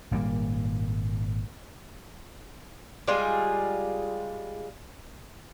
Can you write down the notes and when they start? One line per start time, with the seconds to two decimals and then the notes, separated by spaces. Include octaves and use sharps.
0.11 G#1 A#2 G3 A#3
3.08 G3 G#3 F4 G#4